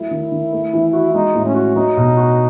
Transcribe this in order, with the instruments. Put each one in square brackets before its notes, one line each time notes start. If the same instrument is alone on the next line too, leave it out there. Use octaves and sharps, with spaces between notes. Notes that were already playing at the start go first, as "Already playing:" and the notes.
Already playing: [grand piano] F#3 A3 [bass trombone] E4
[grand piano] D#3
D#3
A3
E3
F#4
[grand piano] G#3 [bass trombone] D#4
[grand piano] A2
[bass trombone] C#4
[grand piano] F#4
[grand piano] F#3 [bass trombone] D#4
[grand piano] B2
F#4